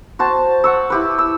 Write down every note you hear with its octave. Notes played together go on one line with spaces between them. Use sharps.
F#4 C5 A5
F#5 C#6 E6
E4 G4 B4
E6